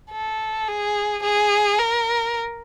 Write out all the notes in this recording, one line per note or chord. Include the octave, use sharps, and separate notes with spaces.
A4
G#4
G#4
A#4